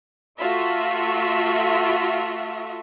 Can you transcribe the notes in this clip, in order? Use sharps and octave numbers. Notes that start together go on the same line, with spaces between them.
A3 F4 F#4 E5